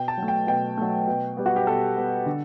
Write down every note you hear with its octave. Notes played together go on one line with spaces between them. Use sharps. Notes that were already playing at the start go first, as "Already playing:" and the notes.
Already playing: B2 G5
A5
F#3 A3
G5
B2 G5
F#3 A3
B2
G3 B3
F#4
G4
B2 A4
G3 B3
D3